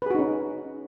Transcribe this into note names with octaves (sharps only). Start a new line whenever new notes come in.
C#4 D#4 F#4 G#4 B4